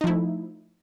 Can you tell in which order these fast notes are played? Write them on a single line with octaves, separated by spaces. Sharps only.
D#4 F3 E4 A3